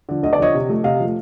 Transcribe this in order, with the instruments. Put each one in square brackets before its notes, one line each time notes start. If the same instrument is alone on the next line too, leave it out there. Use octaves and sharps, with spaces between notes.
[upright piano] D3 F3
D2 D#5
D5
D3 F3 C#5 D#5
C3
F3 A3
C3 D#5 F5
F3 A3